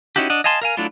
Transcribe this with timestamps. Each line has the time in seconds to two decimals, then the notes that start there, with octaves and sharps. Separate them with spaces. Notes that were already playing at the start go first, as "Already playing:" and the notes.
0.16 C#4 D#4 E4 F#4 G4
0.30 D4 D#5 F#5
0.44 D#5 F5 G#5 A5 C6
0.62 A#4 F5 G#5
0.77 F#3 A3 D4 E4 F4